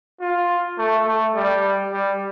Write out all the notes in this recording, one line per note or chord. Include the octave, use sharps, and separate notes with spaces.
F4
A3
A3
G3
G3